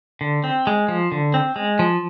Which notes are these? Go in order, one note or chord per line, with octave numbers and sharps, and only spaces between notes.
D3
C4
G#3
F3
D3
C4
G#3
F3